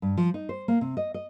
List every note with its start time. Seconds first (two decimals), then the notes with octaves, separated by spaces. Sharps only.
0.02 G2
0.17 F3
0.34 D#4
0.49 C5
0.68 A#3
0.81 C3
0.97 D#5
1.14 D#5